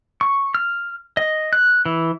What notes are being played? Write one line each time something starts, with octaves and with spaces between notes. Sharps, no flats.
C#6
F6
D#5
F#6
E3